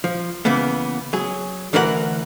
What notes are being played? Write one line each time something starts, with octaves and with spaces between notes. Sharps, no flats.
F3
C#3 E3 A#3 B3
F#3 G#4
D2 E3 F#4 A#4 B4 F#5